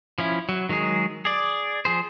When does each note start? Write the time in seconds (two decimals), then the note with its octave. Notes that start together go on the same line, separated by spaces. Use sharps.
0.18 F3 C#4 E4
0.49 F#3
0.69 D#3 F#3 G#3 G#4
1.25 G#4 D5
1.85 F3 G#4 C5